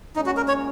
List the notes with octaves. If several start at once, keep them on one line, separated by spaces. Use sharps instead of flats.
A#2 G#3 C#4 D#4
F#4
A#4
C#5